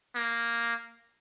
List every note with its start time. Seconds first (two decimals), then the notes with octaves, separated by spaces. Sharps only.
0.15 A#3